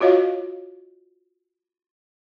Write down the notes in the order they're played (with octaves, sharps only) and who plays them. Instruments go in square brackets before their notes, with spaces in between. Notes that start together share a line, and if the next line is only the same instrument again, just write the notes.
[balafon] F4 F#4 C#5 D#5 F5